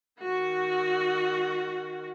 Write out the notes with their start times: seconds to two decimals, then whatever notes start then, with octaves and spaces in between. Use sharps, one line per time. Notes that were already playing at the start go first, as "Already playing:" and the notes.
0.20 D#3 F#4